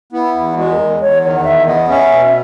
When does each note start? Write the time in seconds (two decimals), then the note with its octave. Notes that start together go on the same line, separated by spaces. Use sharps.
0.12 B3 E4
0.35 E2
0.56 G#3 F#4
0.71 A#4
0.79 E2
1.01 E2 C#5
1.23 D#3 C#5
1.35 F#5
1.44 E2 E5
1.67 B3 D#5
1.88 C#4 E5
2.11 B2